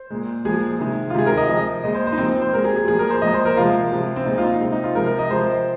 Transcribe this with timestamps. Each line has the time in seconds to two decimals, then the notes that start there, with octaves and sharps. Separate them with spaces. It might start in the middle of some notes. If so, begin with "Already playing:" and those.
Already playing: C5
0.10 A#2 G#3
0.45 A#2 F3 G#3 G#4
0.80 C3 D#3 G#3
1.10 F4
1.14 C3 D#3 G#3 G#4
1.26 A#4
1.37 D#5
1.48 C3 F3 G#3 D#5
1.84 A#2 G#3 D#5
1.95 C5
2.07 C5
2.12 D#4
2.18 A#2 F3 G#3 C4
2.42 C5
2.53 A#2 G#3 A#4
2.64 G#4
2.76 G#4
2.88 A#2 F3 G#3 G#4
2.99 A#4
3.10 C5
3.22 A#2 F3 G#3 D#5
3.34 C5
3.45 A#4
3.57 C3 F3 G#3 F4
3.91 C3 F3 G#3
4.16 C4
4.26 A#2 G#3 D#4
4.38 F4
4.43 D#4
4.60 C3 G#3 C4
4.72 D#4
4.84 F4
4.95 C3 F3 G#3 A#4
5.06 A#4
5.19 D#5
5.30 C3 F3 G#3 C5